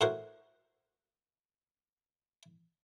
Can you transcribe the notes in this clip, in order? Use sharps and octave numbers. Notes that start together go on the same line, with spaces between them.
A2 F#4 A#4 C5 F#5